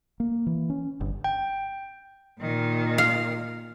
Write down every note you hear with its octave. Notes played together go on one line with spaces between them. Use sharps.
A#3
E3
C#4
G1
G5
A#2 D#3
F5